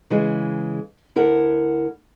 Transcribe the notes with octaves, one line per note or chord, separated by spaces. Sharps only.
C#3 E3 G#3
D2 E4 A#4 F#5